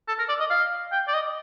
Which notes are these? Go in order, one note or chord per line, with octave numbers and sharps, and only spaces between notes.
A4
A#4
D5
D#5
F5
G5
D5
D#5